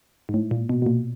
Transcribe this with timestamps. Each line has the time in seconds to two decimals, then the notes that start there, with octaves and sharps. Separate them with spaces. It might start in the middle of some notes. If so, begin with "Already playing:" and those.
0.29 G#2
0.34 A2
0.51 A#2
0.69 B2
0.82 B2
0.86 A#2